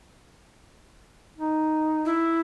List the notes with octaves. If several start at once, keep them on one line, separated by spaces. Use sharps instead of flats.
D#4
E4